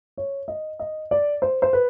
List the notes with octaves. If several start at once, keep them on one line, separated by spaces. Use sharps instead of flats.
C#5
D#5
D#5
D5
C5
C5
B4